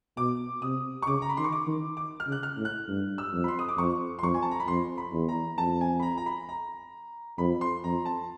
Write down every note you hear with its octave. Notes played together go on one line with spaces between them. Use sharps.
B2 D6
C3 D#6
C#6
C#3 D6
A#5
B5
D#3 C6
C#6
D6
D#3
D6
F6
C#3
F#6
F6
A2
F#6
G2
E6
F2
B5
C6
D#6
D6
F2 C#6
C6
F2 C#6
G#5
A5
A#5
B5
F2 C6
B5
E2
A#5
F2 A5
G#5
B5
A#5
A#5
B5
A#5
F2 B5
C6
F2 A#5
A5